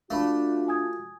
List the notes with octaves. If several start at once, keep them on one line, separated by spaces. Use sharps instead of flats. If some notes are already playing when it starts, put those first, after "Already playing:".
A3 D4 F4 F#4 F5 B5
G#5 D#6 G#6